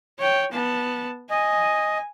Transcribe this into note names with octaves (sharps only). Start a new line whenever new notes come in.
C#5 G5
B3 A5
D#5 G#5